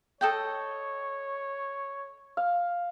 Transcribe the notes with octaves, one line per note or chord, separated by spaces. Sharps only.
A4 C#5 D#5 G5
F5